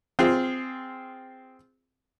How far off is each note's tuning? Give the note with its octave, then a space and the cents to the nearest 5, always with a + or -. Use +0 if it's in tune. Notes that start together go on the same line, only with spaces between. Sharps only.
C4 -10 F4 +0 G#4 -10